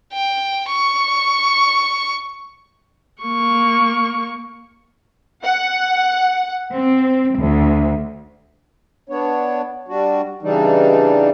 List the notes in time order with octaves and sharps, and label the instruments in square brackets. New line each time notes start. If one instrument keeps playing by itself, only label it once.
[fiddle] G5
C#6
[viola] A#3 C#6
[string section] F#5
C4
D2
[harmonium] B3 D4 C#5
G3 D4 F#4
C#3 E3 G3 D4 D#4